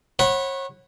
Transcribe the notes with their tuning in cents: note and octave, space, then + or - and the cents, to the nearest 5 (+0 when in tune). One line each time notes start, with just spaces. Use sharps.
C#5 -35 F#5 +0 B5 +0